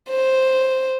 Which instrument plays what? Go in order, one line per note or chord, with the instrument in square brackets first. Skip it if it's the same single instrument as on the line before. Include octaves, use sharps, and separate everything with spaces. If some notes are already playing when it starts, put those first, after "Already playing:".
[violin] C5